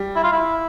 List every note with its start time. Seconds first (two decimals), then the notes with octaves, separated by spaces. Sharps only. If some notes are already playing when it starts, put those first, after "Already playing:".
Already playing: G3
0.16 E4
0.24 F4
0.33 E4